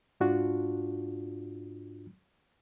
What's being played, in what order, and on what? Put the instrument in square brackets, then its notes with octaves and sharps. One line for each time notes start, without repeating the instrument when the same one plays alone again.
[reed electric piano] G#2 D4 F4 F#4